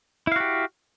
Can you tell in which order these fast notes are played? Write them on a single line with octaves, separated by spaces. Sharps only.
E4 F5 F#4 G4